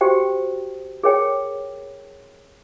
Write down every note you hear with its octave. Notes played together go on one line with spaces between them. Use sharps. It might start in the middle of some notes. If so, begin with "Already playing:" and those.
F#4 G4 C5 G5
G#4 A#4 C#5 G5